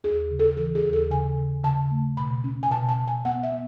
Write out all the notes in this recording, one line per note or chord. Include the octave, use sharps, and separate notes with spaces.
D#2 G#4
C#3
A4
E3 A4
G#4
D#2
A4
C#3 G#5
C#3
C#3 A5
A3
B2 B5
C#4
G#5
B2 A5
A5
B2
G#5
B3 F#5
E5
B3